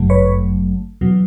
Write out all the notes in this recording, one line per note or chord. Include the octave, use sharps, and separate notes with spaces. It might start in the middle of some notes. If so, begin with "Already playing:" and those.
Already playing: G1 F#2 C#3 F#3 A3
B4 C#5
E2 B2 F#3